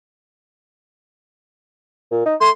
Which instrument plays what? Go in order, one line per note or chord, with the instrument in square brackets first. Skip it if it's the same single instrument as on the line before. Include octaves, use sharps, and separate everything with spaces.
[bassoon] A#2
D#4
[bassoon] A3 [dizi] C6